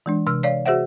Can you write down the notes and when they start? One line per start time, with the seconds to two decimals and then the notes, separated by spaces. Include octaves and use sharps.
0.06 E3 G#3 D4
0.27 C3 E6 F6
0.43 C#5 D5 F5
0.66 F#4 G#4 C5 E5 F#5